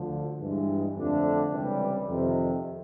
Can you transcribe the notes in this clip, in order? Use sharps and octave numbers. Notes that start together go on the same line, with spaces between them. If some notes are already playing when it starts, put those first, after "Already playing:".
Already playing: D2 D3 F3
G2 E3 G#3
F2 D3 F3 A3 D4
C#2 C3 E3 G3
F2 C3 D#3